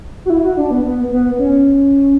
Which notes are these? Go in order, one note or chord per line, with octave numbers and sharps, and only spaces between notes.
F#4
E4
F#4
D4
B3
B3
B3
C#4